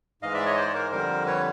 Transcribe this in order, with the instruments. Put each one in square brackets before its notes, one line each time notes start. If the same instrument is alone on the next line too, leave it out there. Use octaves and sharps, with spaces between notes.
[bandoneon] G#2 E3 G#3 D#5 F5
D5 E5
C#5 D#5
C5 D5
C#5
A#4 C5
F2 D3 G3 A#4 C5
B4 C#5